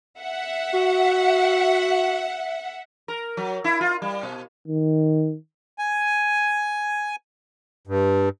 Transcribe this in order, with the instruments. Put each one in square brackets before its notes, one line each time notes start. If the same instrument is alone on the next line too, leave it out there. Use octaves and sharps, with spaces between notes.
[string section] E5 F#5
[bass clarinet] F#4
[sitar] A#4
F#3
E4
F4
G3
B2
[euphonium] D#3
[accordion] G#5
G2